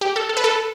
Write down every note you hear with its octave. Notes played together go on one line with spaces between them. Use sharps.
G4
A4
A4
B4
A4